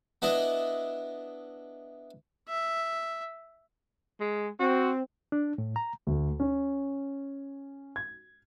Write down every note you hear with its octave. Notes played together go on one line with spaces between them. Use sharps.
B3 D4 E4 D#5
E5
G#3
C4 F#4
D4
A2
A#5
D2
C#4
G#6